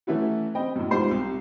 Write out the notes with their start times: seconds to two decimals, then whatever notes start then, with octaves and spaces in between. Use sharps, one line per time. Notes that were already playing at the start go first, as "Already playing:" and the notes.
0.07 E3 F#3 A3 C#4 E4 F#4
0.55 C4 D#5 G5 B5
0.75 F#2 A2
0.91 G#2 F3 G3 C5 C7
1.11 C2